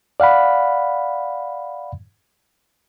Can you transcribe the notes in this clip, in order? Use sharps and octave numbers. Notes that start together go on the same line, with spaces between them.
D5 F5 F#5 B5